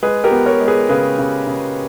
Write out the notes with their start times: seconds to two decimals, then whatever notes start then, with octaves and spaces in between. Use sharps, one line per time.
0.03 G#3 G#4 B4
0.24 G4 A#4
0.31 B3
0.46 A#4 C#5
0.60 G#3
0.68 G#4 B4
0.89 C#3 G#4 B4
1.18 C#3
1.47 C#3